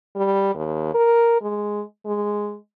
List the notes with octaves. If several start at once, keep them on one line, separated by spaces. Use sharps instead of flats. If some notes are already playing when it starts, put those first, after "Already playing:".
G3
D#2
A#4
G#3
G#3